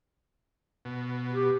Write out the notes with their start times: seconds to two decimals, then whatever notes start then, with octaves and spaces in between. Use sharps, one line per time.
0.85 B2
1.33 G4